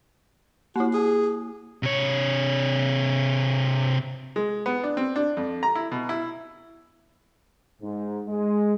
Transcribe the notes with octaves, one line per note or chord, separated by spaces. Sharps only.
A#3 E4 F#4
G#4
C3 C#5
G#3
B3
D4
C4
D4
F2
A#5
E4
B2
E4
G#2
G#3